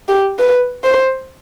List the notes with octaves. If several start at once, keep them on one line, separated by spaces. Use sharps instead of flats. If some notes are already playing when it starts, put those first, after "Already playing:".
G4
B4
C5